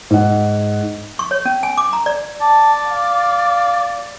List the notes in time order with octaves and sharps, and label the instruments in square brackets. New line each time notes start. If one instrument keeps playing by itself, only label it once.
[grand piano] G#2 F#5
[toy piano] C#6
C#5
C#4
G#5
D6
A#5
D5
[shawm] D5 [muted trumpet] A5
[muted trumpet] F5